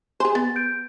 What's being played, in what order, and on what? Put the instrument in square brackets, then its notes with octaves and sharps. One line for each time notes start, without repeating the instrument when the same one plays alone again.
[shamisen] G#4 C5 [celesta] G#5
[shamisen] B3 [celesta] A6
[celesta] G6 D7